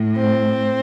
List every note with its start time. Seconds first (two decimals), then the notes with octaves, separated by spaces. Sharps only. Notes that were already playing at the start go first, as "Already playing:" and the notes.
Already playing: A2
0.17 C4